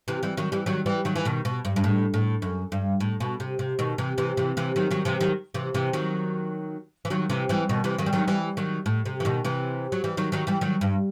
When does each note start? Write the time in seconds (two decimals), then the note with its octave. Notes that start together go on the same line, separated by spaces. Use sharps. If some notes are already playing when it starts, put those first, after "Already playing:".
0.08 C3 E3
0.23 E3 G3
0.37 D#3 F#3
0.52 E3 G3
0.66 D#3 F#3
0.86 E3 G3
1.05 D#3 F#3
1.16 E3
1.25 B2 D#3
1.45 B2
1.65 G2
1.76 G2
1.84 A2
2.14 A2
2.42 F#2
2.72 G2
3.00 A2
3.20 B2
3.40 C3
3.59 C3
3.79 B2 D#3
3.98 C3 E3
4.18 C3 E3
4.37 C3 E3
4.57 C3 E3
4.76 D#3 F#3
4.91 D#3 F#3
5.05 C3 E3
5.21 D#3 F#3
5.54 C3 E3
5.74 C3 E3
5.93 D#3 F#3
7.05 E3
7.10 D#3 F#3
7.30 C3 E3
7.49 E3 G3
7.69 B2 D#3
7.84 C3 E3
7.98 D#3 F#3
8.06 G3
8.13 D#3 F#3
8.28 E3 G3
8.57 D#3 F#3
8.86 A2
9.06 C3
9.20 E3
9.25 B2 D#3
9.45 C3 E3
9.92 F#3
10.04 E3 G3
10.17 D#3 F#3
10.32 D#3 F#3
10.47 E3 G3
10.61 D#3 F#3
10.81 G2